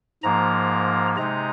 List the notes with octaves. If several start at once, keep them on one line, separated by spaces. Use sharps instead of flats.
G#2 F3 A#3 A#5
C3 G#3 D#4 A#5